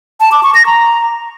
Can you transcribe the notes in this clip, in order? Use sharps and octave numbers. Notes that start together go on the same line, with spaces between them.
A5
D6
C#6
A#6
A#5